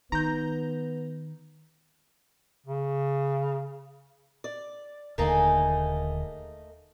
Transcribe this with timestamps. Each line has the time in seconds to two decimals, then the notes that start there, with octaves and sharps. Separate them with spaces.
0.12 D#3 B3 D#4 A#5 G6
2.67 C#3
4.44 D5
5.18 D#1 D#2 D3 A3 A#3 D#4 G#4 G#5